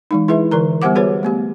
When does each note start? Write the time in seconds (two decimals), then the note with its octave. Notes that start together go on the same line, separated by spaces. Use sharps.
0.11 E3 G#3 D#4
0.28 E4 G#4 B4 E5
0.51 D3 E3 A#4 A#5
0.82 G3 B3 G4 C5 F#5 D6
0.95 F#4 G#4 B4 C#5
1.23 A3 B3 G4